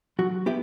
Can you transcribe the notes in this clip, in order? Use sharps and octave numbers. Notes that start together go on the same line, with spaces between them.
F#3 F#4
B3 E4 G4